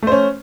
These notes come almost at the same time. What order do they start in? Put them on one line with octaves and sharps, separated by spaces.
A3 C5 C#4